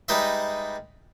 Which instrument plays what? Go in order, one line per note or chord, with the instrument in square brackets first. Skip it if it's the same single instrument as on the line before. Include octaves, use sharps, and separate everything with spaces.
[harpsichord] G3 G#3 D#4 B4 D#5 E5